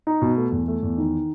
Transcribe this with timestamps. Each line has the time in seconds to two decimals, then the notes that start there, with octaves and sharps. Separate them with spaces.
0.07 D#4
0.22 B2
0.37 A3
0.52 E2
0.68 A3
0.83 E2
0.98 D#3